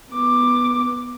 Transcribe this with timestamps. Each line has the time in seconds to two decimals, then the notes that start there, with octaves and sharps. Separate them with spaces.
0.14 B3 D6